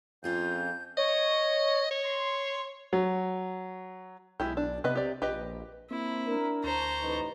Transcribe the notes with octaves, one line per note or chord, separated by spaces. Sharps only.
F2 C#4 F4 G#4 G6
C#5 D#5
C#5
C6
F#3
B1 G#3 E4 G4
D4
C3 B3 B4 D#5
G4 D5
A#1 G4 B4 D#5
A#3 C4 E4
D4 A#4
D2 C5 A5 A#5 C#6
A1 D#4 B4